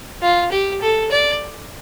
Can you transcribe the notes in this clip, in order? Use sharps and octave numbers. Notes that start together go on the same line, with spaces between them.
F4
G4
A4
D5